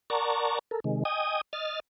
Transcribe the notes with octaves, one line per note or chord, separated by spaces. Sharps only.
A#4 D5 F#5 A5 A#5 C#6
A4 A#4
C3 D#3 G#3
D#5 G5 G#5 D#6
D#5 F6 A6